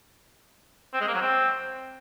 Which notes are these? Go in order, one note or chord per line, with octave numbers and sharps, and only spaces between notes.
C4
G#3
A#3
F#3
C4